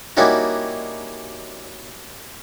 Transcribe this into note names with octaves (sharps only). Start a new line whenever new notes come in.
G3 A#3 C#4 D#4 E4 F#4